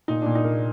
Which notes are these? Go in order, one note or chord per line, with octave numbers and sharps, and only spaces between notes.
A#2 D#4
A#2 D4
D#4
A#3